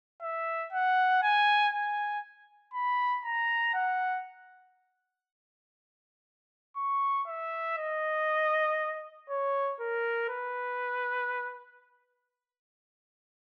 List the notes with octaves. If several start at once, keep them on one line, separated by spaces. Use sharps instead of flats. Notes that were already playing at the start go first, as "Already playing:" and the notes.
E5
F#5
G#5
G#5
B5
A#5
F#5
C#6
E5
D#5
C#5
A#4
B4